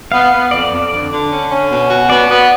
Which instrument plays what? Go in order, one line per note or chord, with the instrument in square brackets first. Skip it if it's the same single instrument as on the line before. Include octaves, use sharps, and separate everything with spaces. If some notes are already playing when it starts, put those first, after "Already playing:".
[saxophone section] B3 [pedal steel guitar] F5
[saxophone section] B3
[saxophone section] F2 [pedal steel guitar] D5
[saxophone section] F2
D3
D3
C#4
C#4
B2
F#4
[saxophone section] B3 [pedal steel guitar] D5
[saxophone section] B3